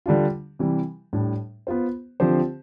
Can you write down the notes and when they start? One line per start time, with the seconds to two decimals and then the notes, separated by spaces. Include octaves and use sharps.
0.06 D3 G3 D4 F4
0.59 C3 E3 G3
1.13 A2 G3 D4
1.67 B3 F4 C5
2.20 D3 F3 C4 G4 C5